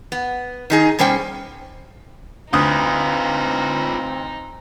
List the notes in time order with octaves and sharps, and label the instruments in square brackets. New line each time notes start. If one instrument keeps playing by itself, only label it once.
[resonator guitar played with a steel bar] B3
D#3 D#4 G#4
B2 G3 C#4 C5 G5
[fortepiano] D2 D#6 [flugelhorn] C4 [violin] D#4 [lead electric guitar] F4 B4